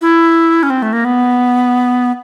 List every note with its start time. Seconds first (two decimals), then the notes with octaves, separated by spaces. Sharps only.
0.01 E4
0.63 C#4
0.70 C4
0.82 A3
0.93 A#3
1.05 B3